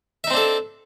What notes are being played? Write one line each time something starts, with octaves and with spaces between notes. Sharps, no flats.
C4 D4 D#4 A4 E5